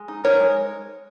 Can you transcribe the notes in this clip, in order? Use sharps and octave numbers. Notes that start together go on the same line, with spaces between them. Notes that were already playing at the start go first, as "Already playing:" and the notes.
Already playing: G#3
D#4
D#4 A#4 C#5
G#3